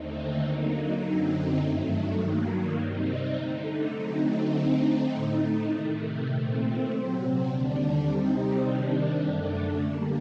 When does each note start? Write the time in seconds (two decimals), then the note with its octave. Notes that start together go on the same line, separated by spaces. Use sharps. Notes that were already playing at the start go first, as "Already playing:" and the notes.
Already playing: D#2 D3 A3 C4 D#4
0.43 D3 F#3 A#3 D#4
1.02 F#2 D3 F#3 C4 D#4
1.60 G2 D#3 F#3 A3
2.19 G2 D#3 F#3 A#3
2.77 C3 G3 C4 D#4
3.36 D3 A3 D#4
3.95 D3 F#3 A3 C4 D#4
4.54 D3 A3 C4 D#4
5.12 A2 A3 D#4
5.71 C3 D#3 A3
6.29 A#2 A3 C4
6.87 C3 F#3 C4
7.47 D#2 D3 G3 D4
8.06 C3 G3 C4 D#4
8.63 C3 D#3 G3 D4
9.22 F#2 D3 A3 D4
9.81 D3 G3 A#3